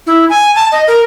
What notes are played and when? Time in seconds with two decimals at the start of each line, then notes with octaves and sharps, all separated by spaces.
0.07 E4
0.30 G#5
0.55 A5
0.72 D#5
0.88 A#4